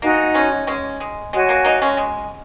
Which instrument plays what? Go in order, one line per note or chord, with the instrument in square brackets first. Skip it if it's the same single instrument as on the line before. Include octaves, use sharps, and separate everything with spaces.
[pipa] A#3 [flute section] D#4 F#4 D#5 G#5
[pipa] G#3 C#4
G#3 C#4
G#3
[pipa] G#3 [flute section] F#4 C#5 G#5
[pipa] A#3
A#3 D#4
G#3 C#4
G#3